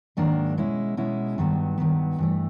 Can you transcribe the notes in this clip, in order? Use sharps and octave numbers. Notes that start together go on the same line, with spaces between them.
G#2 D#3 F#3 A#3 D4
B2 G#3 C#4 E4
B2 G#3 C#4 E4
G2 D#3 F#3 B3
G2 D#3 F#3 B3
G2 E3 A3